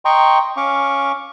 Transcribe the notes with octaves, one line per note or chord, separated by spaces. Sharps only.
D#5 G5 A#5 C6 C#6
C#4 F5 C#6 D6